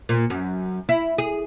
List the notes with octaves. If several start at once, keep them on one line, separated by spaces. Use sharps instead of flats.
A#2
F#2
E4
G#4